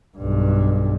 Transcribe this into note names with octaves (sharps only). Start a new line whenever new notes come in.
B1 G2